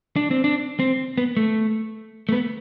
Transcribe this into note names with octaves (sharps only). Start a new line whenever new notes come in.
D4
C4
D4
C4
B3
A3
A3
B3